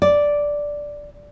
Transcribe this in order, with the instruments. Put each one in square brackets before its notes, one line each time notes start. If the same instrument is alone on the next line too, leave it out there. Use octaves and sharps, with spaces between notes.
[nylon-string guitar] D5